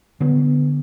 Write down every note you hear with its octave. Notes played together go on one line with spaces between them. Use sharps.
D3 B3